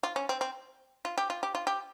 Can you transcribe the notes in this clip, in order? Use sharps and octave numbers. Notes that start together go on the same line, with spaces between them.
F4
C#4
C4
C4
F4
G4
F4
G4
F4
G4